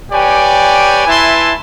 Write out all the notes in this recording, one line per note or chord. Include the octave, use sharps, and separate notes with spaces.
G4 B4 C#5 D5 G5 G#5
E4 B4 E5 G#5 A5 C6